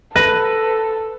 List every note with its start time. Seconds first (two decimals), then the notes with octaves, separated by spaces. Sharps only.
0.16 A4 B4 A#6